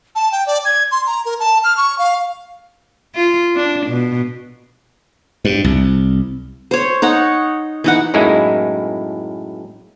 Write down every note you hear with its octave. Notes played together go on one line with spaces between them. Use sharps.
A5
G5
D5
G#6
C6
A#5
A#4
A5
F6
C#6
F5
F4
D4
B2
G2
C2
C5 C#5
D#4 C#5 F#5
E3 D#4 F#5
F#2 A2 G#3 A#3 D#4 E4